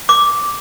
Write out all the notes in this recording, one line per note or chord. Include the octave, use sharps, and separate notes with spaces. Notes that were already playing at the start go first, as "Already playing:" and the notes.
D6